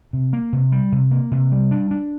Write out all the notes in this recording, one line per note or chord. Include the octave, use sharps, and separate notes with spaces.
C3
A#3
C3
G3
C3
A#3
C3
G3
D4
D4